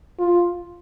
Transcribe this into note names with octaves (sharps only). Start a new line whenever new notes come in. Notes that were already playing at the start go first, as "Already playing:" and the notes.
F4